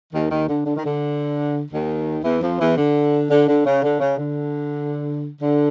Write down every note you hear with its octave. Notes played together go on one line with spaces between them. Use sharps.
D#2 D#3
D#2 D#3
D3
D3
D#3
D3
D#2 D#3
E2 E3
F2 F3
E2 E3
D3
D3
D3
C#3
D3
C#3
D3
D3